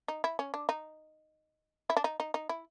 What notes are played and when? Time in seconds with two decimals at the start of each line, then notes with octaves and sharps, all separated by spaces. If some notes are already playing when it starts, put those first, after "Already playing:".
0.08 D#4
0.24 E4
0.39 C#4
0.54 D4
0.69 D#4
1.90 E4
1.97 D4
2.04 D#4
2.20 D#4
2.34 D#4
2.49 E4